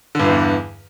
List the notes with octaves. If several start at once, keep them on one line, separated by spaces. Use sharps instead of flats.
E2 G2 D3 E3